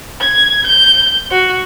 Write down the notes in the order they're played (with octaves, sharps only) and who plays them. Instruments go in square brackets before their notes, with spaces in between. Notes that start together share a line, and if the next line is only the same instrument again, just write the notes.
[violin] G#6
G6
F#4